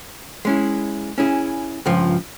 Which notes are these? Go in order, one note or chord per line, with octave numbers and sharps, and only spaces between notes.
G#3 C#4 E4
C#4 E4 G#4
C#2 G2 F3